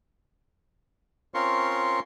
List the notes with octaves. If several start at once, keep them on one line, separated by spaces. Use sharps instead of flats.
C4 C#4 F4 A#4 C6 C#6